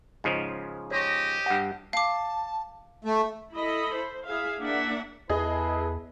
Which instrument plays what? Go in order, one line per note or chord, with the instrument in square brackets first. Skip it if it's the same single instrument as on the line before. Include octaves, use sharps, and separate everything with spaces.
[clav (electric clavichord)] G#2 C#3 F3 [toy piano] D#5
[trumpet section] G4 D#5 [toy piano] C#5 C6 C#6
[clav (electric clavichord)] G2 G5 [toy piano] F#5
[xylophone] F5 D6 [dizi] A5
[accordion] A3 [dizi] E5
[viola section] E4 A4 D#5 B5
C5
E4 G#4 E5 F5
A#3 D4 D5 E5 F#5
[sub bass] E2 [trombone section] E4 A4 B4 [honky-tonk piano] G#4 D#5